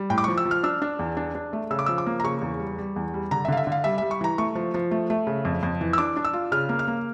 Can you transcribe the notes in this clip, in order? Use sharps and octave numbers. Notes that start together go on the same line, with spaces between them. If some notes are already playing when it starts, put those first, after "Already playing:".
Already playing: G3
A2 G5
D6
F3 C#6
E6
F3
F6
D4 E6
D4
E2
D4
D4
A3
C#3 E6
D6
F3 E6
D6
A#3
A#5
C#3 C#6
E2
G3
G3
E2
G3
D3 A#5
E5
D3 F5
E5
D3 F5
G3 E5
G3 E5
C#6
E3 A#5
A3 C#6
F3
F3
A3
A3
C#3
F2
F2
E3
E6
D4 D6
D4
E6
F4
C#3 F6
A#3
F6
A#3